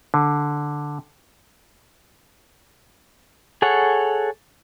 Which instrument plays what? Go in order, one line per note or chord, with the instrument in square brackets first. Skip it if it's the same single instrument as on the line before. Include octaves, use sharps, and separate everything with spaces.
[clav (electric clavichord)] D3
[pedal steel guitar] G#4 A4 C#5 F#5